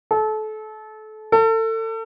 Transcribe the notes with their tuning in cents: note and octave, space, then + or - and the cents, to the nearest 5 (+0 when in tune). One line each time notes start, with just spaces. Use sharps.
A4 -30
A4 +30